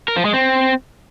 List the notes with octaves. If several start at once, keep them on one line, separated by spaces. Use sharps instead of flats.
A#4
F3
G#3
C4